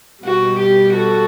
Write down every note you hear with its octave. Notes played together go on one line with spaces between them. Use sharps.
B2 G3 F#4
G4
F#4 A4